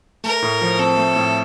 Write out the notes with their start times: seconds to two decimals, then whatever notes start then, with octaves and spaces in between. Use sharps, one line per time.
0.24 A3 A#4
0.42 A2
0.61 F3
0.79 C4 A4
0.97 A3
1.16 A2